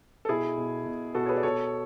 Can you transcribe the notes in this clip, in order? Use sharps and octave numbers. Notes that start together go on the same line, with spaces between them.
A4
B2 E4 G#4
B2
B2
B2 F#4 A4
C#5
G#4 B4
D5
B2 A4 C#5